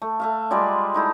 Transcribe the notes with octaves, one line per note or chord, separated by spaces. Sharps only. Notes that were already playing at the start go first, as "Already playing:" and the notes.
A3
A3 E5 F5
G3 G#3 F4 D5
A3 D#4 E4